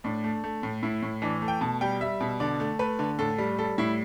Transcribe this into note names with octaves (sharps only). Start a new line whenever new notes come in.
A2 D4
A3
A3
A2
A2 E4
A2
E3 D4
A3
G5
B2 A5
G3 G5
G3 E5
B2
D3 D5
A3
A3 B4
D3
A2 A4
G3
G3 A4
A2 E4